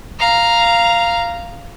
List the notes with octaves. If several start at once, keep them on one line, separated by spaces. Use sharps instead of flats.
F5 A#5